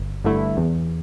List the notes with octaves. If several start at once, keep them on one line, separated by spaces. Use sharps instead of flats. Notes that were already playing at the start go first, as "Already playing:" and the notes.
Already playing: G1
G2 D3 A3 E4
E2